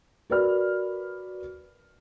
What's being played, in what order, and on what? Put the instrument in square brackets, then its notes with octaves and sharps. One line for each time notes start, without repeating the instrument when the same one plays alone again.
[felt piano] F#4 A#4 B4 D5 B5 F6